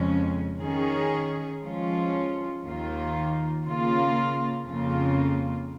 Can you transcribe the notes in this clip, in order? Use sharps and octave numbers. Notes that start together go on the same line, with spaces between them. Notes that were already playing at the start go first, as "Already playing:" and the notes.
Already playing: F2 C#3 G#3 C#4
D#3 C#4 G#4
F3 G#3 C#4 F4
D#2 D#3 A#3 F4
C#3 A#3 F4
F2 C#3 A#3 F4